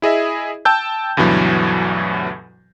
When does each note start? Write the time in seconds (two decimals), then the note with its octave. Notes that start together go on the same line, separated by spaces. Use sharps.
0.02 E4 G#4 D#5 E5
0.65 G5 A5 E6 G6
1.17 D2 G2 B2 E3 F#3